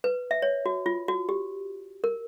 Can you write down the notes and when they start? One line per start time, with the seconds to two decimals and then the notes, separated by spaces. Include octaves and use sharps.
0.04 B4
0.31 E5
0.42 C#5
0.66 F#4
0.86 F4
1.08 F#4
1.29 G4
2.04 A#4